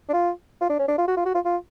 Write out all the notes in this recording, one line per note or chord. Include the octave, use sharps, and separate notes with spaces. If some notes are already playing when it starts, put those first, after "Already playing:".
D4
F4
F4
D4
C#4
D4
F4
F#4
F4
F#4
F4
F4